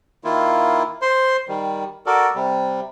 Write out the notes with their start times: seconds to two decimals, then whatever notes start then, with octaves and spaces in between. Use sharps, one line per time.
0.24 D#3 A#3 E4 F4
1.02 C5 C6
1.48 D#3 G3
2.06 F#4 A4 A#4 D5
2.35 C3 G3